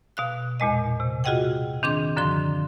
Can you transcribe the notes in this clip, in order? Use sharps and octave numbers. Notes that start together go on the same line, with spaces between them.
B2 F5 F#6
E2 A#2 G#3 D#5
C3
F4 F#4 G#4 D#5 F#5 G5
D#3 C4 D4 G#4 D6
F#2 D3 F3 C6